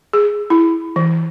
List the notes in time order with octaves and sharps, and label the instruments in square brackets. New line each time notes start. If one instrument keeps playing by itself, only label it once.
[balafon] G#4
E4
E3